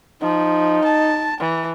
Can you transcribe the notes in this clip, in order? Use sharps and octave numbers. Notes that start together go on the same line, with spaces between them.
F3 D#4
A5
E3